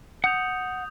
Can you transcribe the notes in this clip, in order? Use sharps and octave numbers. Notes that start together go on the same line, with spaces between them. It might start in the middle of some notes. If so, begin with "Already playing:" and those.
F#5 D#6 G6 F7